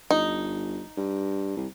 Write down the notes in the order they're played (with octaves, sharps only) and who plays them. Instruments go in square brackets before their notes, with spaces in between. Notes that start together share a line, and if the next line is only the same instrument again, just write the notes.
[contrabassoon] G1 [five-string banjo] D#4
[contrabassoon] G2
C2